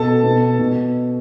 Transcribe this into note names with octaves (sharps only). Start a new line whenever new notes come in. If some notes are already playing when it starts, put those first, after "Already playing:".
Already playing: B2 A4 A5
B2
B2